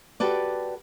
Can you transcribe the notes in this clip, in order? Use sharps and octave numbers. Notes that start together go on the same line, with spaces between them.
F#4 G4 A4 B4 D5